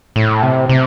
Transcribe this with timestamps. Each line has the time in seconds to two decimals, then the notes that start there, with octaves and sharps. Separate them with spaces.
0.16 A2
0.43 C3
0.69 C3